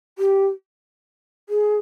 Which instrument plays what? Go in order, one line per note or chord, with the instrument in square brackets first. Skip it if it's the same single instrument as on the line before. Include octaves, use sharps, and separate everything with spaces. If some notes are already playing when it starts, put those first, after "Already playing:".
[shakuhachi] G4
G#4